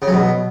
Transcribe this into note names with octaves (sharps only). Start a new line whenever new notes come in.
C#3
F#3
B2